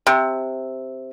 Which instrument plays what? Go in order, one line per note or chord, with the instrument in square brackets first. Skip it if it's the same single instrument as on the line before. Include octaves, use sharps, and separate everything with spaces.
[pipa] C3